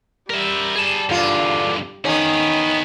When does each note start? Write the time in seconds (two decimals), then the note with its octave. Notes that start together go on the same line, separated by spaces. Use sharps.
0.30 G3 A#4 E5
0.76 G#4 A5
1.09 E2 G2 D3 F4
2.05 D#3 B3 C#4 G#4